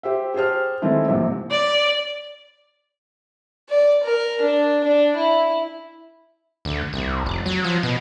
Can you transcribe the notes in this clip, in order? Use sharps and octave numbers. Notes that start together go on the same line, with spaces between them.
G4 C5 E5
G4 G#4 C5 A5 F6
D#3 E3 G#3 A3 C4 E4
A#1 G#2 C3
D5
D5
A#4
D4
D4
E4
D2
C2
F1
F#3
F3
B2